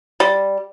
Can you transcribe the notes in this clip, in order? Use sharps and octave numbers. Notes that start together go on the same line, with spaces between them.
G3